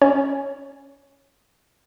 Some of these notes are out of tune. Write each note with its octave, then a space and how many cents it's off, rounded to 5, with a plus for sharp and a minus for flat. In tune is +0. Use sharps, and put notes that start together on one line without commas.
C#4 +5 C#5 +0